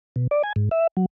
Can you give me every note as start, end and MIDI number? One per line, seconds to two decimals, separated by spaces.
0.16 0.27 47
0.31 0.42 74
0.43 0.53 80
0.56 0.69 44
0.71 0.87 76
0.97 1.06 54